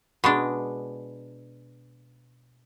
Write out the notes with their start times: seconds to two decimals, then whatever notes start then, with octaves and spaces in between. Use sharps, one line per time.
0.24 B2 G#3 D4